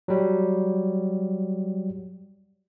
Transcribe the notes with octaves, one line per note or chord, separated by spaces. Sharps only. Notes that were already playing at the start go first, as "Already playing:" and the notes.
F#3 G3